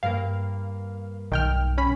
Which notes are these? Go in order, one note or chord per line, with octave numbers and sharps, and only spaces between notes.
G2 A#3 A#4 F5
B1 D#3 G5 F6
C#4 B5